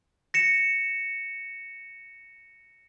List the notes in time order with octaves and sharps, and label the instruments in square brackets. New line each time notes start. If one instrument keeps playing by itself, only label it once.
[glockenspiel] A#6 C#7 E7